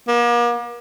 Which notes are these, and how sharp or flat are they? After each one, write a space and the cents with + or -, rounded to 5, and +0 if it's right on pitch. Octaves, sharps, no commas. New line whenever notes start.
A#3 +40